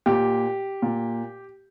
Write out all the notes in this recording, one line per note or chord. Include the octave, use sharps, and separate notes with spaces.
A#2 G4
A#2